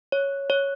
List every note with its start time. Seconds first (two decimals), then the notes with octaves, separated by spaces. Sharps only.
0.12 C#5
0.50 C#5